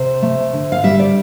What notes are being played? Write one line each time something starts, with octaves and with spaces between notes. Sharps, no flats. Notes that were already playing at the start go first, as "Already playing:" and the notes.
Already playing: C3 C5
A3
D3
F5
G3 E5
D5